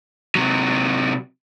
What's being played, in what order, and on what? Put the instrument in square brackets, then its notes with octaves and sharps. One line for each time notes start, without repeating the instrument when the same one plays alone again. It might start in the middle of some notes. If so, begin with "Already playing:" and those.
[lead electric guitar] C3 F#3